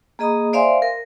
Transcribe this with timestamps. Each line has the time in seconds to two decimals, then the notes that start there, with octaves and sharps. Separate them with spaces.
0.19 A#3 G#4 D#5 A#5 B5 D#6
0.53 C5 D5 E5 F5 G#5 C6
0.82 A#4